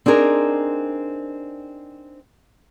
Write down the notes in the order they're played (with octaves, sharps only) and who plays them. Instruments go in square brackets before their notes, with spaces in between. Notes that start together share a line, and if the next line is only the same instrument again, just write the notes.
[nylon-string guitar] C4 D4 D#4 G#4 A#4